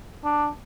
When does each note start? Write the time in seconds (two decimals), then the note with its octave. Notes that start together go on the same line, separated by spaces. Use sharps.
0.24 D4